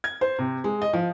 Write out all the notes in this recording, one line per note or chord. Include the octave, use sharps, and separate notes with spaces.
G#6
C5
C3
G#3
D#5
F3